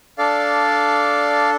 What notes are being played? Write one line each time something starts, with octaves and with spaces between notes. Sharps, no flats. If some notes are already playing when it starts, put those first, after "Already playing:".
D4 A4 D5 F5